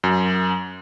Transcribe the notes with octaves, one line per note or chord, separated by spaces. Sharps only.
F#2